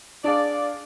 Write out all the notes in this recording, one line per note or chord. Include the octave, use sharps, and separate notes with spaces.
D4 G#4 D5 F5